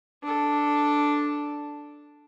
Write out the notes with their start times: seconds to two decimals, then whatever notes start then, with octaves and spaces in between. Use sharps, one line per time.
0.23 D4 A4